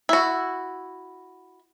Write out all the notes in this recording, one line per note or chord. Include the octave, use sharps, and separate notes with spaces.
E4 F#4